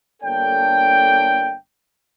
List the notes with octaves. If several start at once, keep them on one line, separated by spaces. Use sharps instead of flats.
G1 A#3 D4 A4 C#5 G5